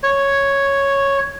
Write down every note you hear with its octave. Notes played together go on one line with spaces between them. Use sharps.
C#5